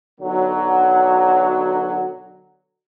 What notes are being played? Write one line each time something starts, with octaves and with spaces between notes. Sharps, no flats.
B1 D3 F#3